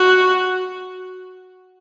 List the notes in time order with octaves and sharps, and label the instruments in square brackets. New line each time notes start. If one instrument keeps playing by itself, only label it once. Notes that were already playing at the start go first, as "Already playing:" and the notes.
Already playing: [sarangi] F#4